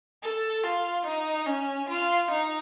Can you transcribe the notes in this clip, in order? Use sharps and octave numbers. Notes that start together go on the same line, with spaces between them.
A4
F4
D#4
C#4
F4
D#4